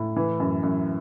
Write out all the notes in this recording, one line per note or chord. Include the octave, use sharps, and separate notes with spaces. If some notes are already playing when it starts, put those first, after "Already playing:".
Already playing: A2
E3
F#2
F#2